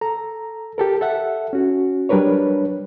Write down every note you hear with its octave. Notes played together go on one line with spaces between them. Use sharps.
A4 A#5
G4 A4 A#4
A4 E5 F#5
C#4 F#4
F#3 G3 D4 A#4 B4 C#5